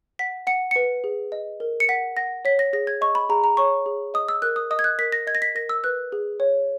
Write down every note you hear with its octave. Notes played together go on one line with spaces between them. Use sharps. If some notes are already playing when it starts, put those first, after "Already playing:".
F#5 B6
F#5 C#7
B4 C#7
G#4
D#5
A#4
C#7
F#5 B6
F#5 A#6
C#5 B6
A#6
G#4 A#6
G#6
D#5 C#6
B5
G#4 A#5
A#5
C#5 C#6
G#4
D#5 D#6
E6
A#4 F#6
D#6
D#5 D#6
G#6
F#6
A#4 B6
A#6
D#5 G#6
A#6
B6
A#4 A#6
E6
B4 F#6
G#4
C#5